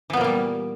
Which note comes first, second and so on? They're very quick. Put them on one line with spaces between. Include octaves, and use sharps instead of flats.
E3 B3 A#2 A#3 G3